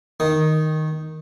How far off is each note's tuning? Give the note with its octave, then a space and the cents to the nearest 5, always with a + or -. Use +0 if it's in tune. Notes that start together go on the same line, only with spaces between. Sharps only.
D#3 +0 D#6 +0